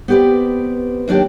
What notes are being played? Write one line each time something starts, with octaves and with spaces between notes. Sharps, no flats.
B3 C4 G4 B4 D5
D#2 F#3 D4 G4 G5